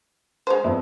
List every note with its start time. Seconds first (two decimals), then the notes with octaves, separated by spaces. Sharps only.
0.47 G#3 C5
0.64 F2 B3 E5